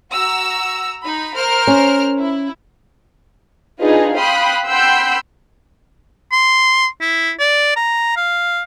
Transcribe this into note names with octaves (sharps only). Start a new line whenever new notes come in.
F#4 A#5 E6
D#4 B5
A#4 C5 F6
C#4
E4
D4 D#4 F4 G#4 B4 D#5
F5 G5 B5 C6 D#6 F#6
F#5 G5 B5 C6 E6 G6
C6
E4
D5
A#5
F5